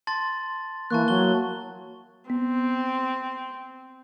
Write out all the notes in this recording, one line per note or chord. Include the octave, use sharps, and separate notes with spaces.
A5 C6 A6
E3 A#3 A5 C#6 F#6
F#3 G7
B3 C4